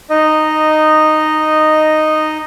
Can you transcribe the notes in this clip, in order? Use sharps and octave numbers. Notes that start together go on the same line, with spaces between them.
D#4 D#5